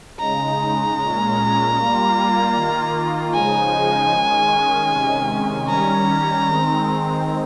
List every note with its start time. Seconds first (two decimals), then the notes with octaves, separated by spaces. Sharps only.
0.19 C#3 G#3 D#4 A#5
0.98 A#2 G#3 C#4
1.76 G3 A#3 F4
2.55 D#3 A#3 F4
3.34 C#3 F3 G#3 D#4 G#5
4.12 D#3 G#3 C#4
4.91 C3 D#3 G#3 C#4
5.69 D#3 G3 C#4 A#5
6.48 D#3 G#3 C4